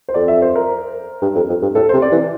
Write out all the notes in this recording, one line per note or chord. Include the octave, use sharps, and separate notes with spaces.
C5
F2 D5
E5
C5
A#4
G2
F2
F2
G2
A2 A4
C3 C5
D5
E3